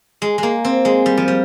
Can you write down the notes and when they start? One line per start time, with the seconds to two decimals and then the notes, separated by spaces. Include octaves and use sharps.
0.22 G#3
0.38 G#3 A#3
0.65 C4
0.85 G#3
1.06 G3
1.17 F3
1.28 G3